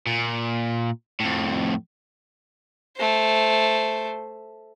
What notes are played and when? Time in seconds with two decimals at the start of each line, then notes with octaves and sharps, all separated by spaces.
0.06 A#2
1.20 F2 A2
2.97 A3 C5